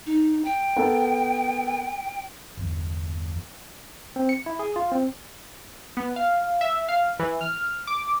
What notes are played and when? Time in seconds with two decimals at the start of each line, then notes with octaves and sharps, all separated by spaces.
0.06 D#4
0.45 G5
0.76 B3 A4 A#4
2.57 G1 E2
4.16 C4
4.29 C#7
4.46 E4
4.59 G#4
4.76 F4
4.92 C4
5.97 B3
6.16 F5
6.61 E5
6.88 F5
7.19 E3
7.41 F6
7.87 D6